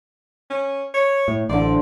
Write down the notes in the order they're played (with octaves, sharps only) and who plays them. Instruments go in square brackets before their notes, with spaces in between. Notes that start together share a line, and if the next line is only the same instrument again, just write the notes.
[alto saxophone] C#4
C#5
[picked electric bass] A2
[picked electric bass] A1 [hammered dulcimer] D3 C5 [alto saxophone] D5